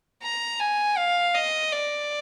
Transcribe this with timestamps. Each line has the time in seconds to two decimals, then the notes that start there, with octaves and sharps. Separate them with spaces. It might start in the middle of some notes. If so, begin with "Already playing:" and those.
0.23 A#5
0.60 G#5
0.97 F5
1.35 D#5
1.72 D5